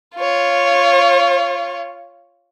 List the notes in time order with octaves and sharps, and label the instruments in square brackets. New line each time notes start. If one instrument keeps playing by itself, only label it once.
[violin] F4 C#5